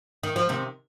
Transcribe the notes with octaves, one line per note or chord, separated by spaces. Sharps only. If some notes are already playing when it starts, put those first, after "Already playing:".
D#3
F3
C3 D#3